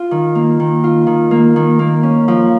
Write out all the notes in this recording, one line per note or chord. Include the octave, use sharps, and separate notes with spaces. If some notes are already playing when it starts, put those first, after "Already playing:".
Already playing: F4
D#3
A#3
D#3
F4
D#3
A#3
D#3
A#3
C#4
F3